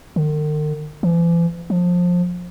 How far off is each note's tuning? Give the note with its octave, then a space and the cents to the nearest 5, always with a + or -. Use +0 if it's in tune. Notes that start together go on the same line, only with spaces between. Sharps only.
D#3 -45
E3 +45
F3 +20